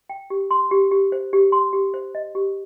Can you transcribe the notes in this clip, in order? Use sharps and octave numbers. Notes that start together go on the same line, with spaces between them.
G5
G4
C6
G4
G4
C5
G4
C6
G4
C5
D#5
G4